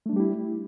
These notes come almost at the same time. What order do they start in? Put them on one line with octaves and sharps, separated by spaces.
A3 D4 G3 G4 E4